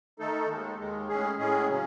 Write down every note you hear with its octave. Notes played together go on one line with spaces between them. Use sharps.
D#3 A3 D#4 A4
D#2 D#3 G#3
D#2 D#3 G#3
A2 G#3 C#4 G#4
A2 G#3 C#4 G#4
C#3 F#3 C#4